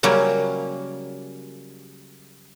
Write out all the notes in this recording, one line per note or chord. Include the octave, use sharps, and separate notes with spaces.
C#3 F#3 G3 A#3 C#4